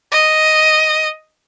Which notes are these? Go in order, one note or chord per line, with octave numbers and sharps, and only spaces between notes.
D#5